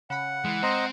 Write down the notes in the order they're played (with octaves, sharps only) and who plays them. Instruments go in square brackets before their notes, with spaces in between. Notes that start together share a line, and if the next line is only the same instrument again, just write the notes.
[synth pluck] C#3 B5 [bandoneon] F#5
[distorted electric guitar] E3 [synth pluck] G#3
[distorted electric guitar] C4 [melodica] C5 D#5 A#5